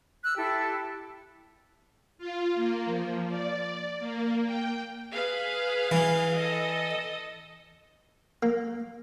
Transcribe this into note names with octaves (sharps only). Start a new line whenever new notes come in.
E6 F#6
E4 G4 A4
F4
A#3
F3
D5
A#3
G5
G#4 B4 F5
E3
A4 D#5
A#3